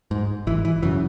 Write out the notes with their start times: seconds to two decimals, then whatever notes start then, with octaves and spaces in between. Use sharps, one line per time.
0.11 G#2
0.47 G#1 E3
0.65 E3
0.83 F#2 C#3 E3